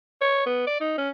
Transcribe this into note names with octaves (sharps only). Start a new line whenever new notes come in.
C#5
B3
D5
D#4
C#4